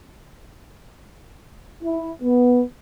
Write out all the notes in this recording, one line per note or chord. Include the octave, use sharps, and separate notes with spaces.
E4
B3